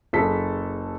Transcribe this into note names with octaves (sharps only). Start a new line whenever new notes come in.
F#1 G#4 A4 B6